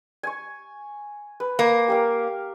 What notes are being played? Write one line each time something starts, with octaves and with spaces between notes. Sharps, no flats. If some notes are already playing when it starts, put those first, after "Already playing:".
G#5 C#6
B4
A#3
G4 A#4 F5